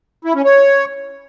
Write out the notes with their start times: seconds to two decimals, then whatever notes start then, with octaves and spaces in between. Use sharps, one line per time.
0.25 E4
0.35 C#4
0.44 C#5